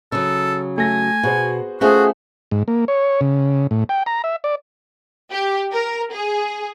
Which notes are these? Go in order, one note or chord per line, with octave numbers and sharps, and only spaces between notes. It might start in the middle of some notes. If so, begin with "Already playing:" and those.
C#3 F#3 A4
A3 G#5 A#6
B2 F#4 G#4 C5
A3 C#4 F4 F#4 G#4 C5 E5 F#5
G#2
A#3
C#5
C#3
A2
G5
A#5
E5
D5
G4
A#4
G#4